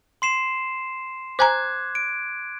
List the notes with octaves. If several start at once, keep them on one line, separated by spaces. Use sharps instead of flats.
C6 C7 E7
C5 G#5 A#5 D6 F#6 G#6
D7